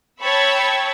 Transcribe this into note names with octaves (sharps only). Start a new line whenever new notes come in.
C#5 G5 A5 B5 C#6 E6